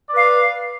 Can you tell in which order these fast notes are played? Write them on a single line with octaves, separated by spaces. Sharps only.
D5 B4 F5